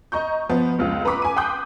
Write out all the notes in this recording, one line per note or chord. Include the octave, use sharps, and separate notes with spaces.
D#5 A#5 C#6 G6
F3 B3
F1 C#2 F4
B4 A#5 B5 C#6 D6 B6
G#5 D#7
G5 C6 D6 D#6 F#6 G6